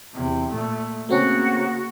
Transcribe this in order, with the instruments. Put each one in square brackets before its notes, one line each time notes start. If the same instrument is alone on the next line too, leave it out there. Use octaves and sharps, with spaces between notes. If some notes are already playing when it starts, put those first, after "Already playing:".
[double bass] E2 C3
A#2 A3
[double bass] C#3 A#3 [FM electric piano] A3 C4 C#4 [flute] F#4